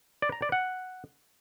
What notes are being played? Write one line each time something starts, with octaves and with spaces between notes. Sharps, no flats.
D5
A#5
D5
F#5